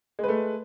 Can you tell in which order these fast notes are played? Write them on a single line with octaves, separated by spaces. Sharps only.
G#3 B4 A3